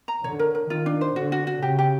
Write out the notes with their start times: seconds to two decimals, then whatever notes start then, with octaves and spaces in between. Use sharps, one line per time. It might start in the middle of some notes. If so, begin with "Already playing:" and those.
0.08 A#5
0.23 D3 C#5
0.39 A#4
0.55 A#4
0.70 D#3 F4
0.86 D4
1.01 C5
1.16 D3 F#4
1.32 F#4
1.47 F#4
1.62 C#3 G4
1.79 G4